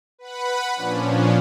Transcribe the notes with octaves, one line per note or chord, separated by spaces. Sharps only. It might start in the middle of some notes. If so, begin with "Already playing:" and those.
B4 F#5 B5
A#2 F3 C#4 D4